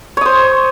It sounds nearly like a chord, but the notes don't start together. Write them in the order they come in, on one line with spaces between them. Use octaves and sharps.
C#5 D#6 C5